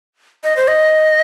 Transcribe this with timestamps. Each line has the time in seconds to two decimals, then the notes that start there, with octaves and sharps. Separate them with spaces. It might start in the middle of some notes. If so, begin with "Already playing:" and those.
0.44 D#5
0.57 C5
0.68 D#5